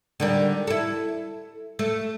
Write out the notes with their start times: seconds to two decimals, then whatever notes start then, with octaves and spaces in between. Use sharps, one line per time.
0.20 D3 D#3 G3
0.67 E4 A4
1.79 A3